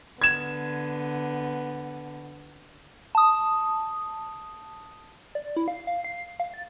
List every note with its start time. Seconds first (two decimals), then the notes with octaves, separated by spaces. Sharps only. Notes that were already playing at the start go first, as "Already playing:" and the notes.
0.22 D3 B3 G#6 E7
3.15 A5 D#6
5.35 D5
5.57 E4
5.68 F5
5.87 F5
6.04 C7
6.40 F5
6.54 A6